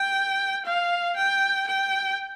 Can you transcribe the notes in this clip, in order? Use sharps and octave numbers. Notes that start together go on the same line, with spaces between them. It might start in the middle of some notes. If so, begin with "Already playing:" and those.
Already playing: G5
F5
G5
G5